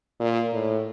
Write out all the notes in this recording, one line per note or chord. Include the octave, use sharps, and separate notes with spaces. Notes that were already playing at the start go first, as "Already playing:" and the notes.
A#2
A2